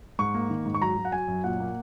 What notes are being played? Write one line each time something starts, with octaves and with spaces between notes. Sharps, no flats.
G#2 C#6
A#3
D#3
G#2
C#6
F#3 A#5
F#3
F#5
F#3 G#5
F#2
A#2 F#5
A#3